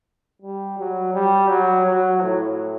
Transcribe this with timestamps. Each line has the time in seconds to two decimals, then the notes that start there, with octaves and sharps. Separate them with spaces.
0.42 G3
0.78 F#3
1.14 G3
1.50 F#3
1.86 F#3
2.22 A2